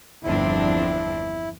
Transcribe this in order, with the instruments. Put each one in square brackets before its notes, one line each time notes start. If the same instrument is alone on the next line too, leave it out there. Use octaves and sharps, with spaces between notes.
[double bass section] G1 E2 [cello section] F3 C4 D4 [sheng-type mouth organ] E4